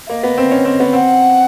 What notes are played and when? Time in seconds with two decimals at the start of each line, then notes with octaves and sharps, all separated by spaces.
0.06 E5
0.09 A#3 D#5
0.23 B3
0.38 C4
0.51 C#4
0.65 C4
0.80 B3
0.93 C4 F#5